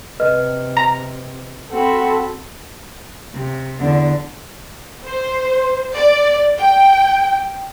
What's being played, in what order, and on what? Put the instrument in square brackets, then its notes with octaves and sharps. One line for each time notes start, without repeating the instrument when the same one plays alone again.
[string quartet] C3 [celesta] B4 D#5 F6
[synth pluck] A#5
[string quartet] C4 F#4 B5 [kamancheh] A4
[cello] C3
E2 D3
[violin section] C5
D5
G5